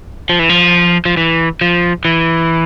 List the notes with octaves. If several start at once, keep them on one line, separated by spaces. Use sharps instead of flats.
F3
E3
F3
F3
E3
F3
E3